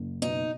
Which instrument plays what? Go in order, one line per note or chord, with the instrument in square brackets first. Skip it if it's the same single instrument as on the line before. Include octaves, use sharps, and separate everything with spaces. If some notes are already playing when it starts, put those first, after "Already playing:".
Already playing: [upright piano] F#1
[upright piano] B2 [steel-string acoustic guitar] D#4